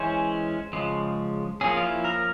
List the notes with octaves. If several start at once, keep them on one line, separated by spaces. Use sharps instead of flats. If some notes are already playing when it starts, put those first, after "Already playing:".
Already playing: E3 G#3 C#4 C5
C#3 F3 G#3
F3 A#3 C#4 G#4
F4
E4
A#4